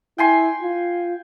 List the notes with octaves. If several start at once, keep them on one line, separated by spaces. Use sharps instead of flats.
E4 G5 G#5 C6
F4